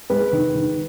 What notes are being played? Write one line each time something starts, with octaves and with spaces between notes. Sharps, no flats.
G#3 B4
D#3
D#3